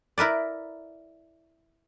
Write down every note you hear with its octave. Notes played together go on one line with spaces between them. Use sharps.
E4 A#4 B4 D5